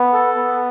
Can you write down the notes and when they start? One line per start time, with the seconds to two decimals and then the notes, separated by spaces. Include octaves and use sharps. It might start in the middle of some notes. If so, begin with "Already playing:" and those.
Already playing: B3
0.13 A4
0.35 B3